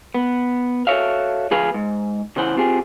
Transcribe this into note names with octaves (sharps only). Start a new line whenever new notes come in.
B3
F#4 A4 A#4 C#5 E5 F5
D2 F3 G#4 B4 F5
G#2
C#3 E3 C5 F#5
C4 F4 G4 G#4